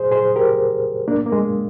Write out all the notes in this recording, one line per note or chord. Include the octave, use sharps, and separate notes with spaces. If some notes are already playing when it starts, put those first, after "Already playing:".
Already playing: G#4 C5
G#4 C5
G4 A#4
A#3 D4
A#3
G#3